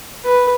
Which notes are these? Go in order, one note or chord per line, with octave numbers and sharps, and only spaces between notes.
B4